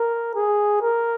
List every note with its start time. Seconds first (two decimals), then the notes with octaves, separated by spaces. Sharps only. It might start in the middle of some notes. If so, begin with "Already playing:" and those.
Already playing: A#4
0.35 G#4
0.81 A#4